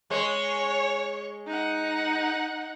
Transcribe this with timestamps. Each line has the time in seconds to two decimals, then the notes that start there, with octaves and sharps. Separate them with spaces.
0.10 G#3 C#5
1.47 D#4 F#5